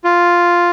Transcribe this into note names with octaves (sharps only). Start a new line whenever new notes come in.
F4